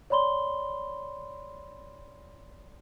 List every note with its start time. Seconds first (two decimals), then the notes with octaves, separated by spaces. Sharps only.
0.10 C#5 D5 B5 C6 G7